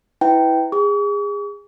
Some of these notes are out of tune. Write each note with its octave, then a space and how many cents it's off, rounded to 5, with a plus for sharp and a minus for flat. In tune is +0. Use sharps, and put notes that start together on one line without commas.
E4 -10 B4 +15 G5 -10
G#4 -30 C#6 +45